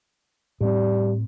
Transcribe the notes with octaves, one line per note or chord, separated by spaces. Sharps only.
A2 G3 C4